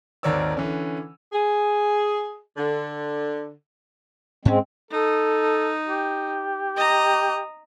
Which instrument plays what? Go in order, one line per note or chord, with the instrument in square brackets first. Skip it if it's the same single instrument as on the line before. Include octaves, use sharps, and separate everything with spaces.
[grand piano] G#1 D#2 A#4 C#5 D5 E6
D3 E3 C#4
[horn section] G#4
D3
[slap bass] G#2 C#4 [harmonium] G#3 C4
[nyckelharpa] D#4 [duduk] A4
[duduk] G4
[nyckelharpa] D#5 A#5